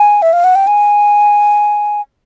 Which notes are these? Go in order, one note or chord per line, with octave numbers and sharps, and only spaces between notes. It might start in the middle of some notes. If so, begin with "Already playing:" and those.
Already playing: G#5
E5
F5
F#5
G5
G#5